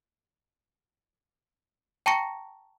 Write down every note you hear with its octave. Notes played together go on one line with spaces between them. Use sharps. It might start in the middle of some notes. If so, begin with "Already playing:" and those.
G5 A5 A#5 C#6 A#6 C#7